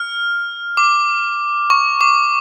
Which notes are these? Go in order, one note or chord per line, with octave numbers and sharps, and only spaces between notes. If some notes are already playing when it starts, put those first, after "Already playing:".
Already playing: F6
D6
C#6
D6